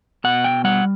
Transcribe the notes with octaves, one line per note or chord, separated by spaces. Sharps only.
B2 F#5
G5
G3 F#5